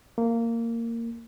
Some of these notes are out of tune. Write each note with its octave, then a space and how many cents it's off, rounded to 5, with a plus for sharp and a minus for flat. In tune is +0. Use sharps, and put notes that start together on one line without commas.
A#3 -15